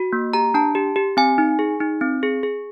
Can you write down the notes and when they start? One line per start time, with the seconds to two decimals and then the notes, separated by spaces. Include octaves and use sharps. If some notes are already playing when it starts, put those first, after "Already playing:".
Already playing: F#4
0.13 A#3
0.33 G4 A#5
0.54 D4 A5
0.75 G4
0.96 G4
1.17 C4 G#5
1.38 D#4
1.59 G#4
1.80 D#4
2.01 C4
2.23 G#4
2.43 G#4